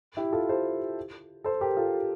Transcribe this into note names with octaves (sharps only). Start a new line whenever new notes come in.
E4 G4
F4 A4
A4 C5
A4 C5
G4 A#4
F4 A4